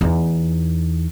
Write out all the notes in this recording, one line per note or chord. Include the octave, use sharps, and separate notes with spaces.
E2 D#4